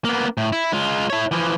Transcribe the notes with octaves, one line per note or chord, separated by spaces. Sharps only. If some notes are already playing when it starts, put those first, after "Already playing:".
A#3 B3
A2
E4
G#3 F4
E4 C#5
E3 F3